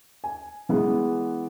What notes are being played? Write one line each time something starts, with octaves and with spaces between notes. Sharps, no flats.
G#5
E3 G#3 B3